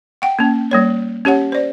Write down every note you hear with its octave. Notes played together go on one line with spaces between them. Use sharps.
F#5 G5
A#3 C#4
G3 A#3 C#5
C#4 G4 C#5 F#5
C5 D5